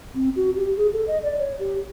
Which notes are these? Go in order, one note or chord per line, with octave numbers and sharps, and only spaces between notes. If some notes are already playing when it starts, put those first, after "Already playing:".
C4
F#4
G4
G#4
A4
D#5
D5
C#5
G4